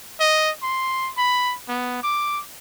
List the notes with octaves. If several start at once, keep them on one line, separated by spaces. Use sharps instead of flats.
D#5
C6
B5
B3
D6